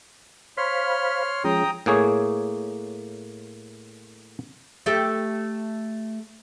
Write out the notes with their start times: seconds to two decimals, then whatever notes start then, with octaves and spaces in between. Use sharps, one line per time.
0.58 C5 C#5 F5 B5 C6 F6
1.44 F3 G#3 C#4 G5 A#5 D#6
1.86 A2 A#3 G#4 C#5
4.86 A3 G4 A4